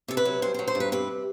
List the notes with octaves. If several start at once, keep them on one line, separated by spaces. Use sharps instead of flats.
C3 A4
B4
F#3
G2 C5
C5
F#3
C5
G2
B4
C3 B4